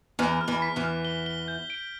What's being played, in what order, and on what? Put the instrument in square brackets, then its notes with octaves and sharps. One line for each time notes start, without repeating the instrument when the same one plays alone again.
[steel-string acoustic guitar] E2 E3 [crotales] F6
[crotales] F6
[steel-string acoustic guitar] E2 E3
[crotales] B6
[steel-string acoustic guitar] E2 E3
[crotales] F6
G7
G7
G6
D7